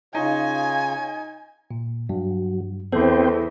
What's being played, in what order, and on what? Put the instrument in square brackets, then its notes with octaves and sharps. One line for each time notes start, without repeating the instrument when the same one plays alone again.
[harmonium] C#3 F4 C#5 [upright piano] D#4 [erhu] G#5
[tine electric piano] A#2
[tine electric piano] G2 [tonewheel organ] F#3
[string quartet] E2 [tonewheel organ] C4 C5 G5 [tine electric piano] A4